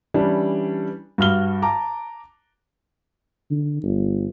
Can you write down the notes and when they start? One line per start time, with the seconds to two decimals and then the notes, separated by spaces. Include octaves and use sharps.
0.14 E3 G3 C#4 D4 E4
1.18 G2 F#4 F6 G7
1.62 A5 A#5 D6
3.50 D3
3.83 G1